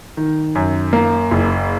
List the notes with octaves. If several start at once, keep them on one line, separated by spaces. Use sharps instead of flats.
D#3
F#2
A#3
F#1